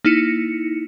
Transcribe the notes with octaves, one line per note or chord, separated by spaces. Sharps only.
A#3 D#4 E4 C#7